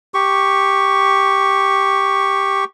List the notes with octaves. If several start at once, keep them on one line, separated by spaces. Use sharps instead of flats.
G4 C#6